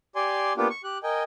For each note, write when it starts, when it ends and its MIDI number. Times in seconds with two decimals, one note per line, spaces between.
0.16 0.53 67
0.16 0.53 74
0.16 0.53 80
0.16 0.53 84
0.57 0.68 58
0.57 0.68 59
0.57 0.68 62
0.57 0.68 65
0.57 0.68 67
0.70 0.82 85
0.84 0.98 67
0.84 0.98 90
1.03 1.23 70
1.03 1.23 75
1.03 1.23 79
1.03 1.23 80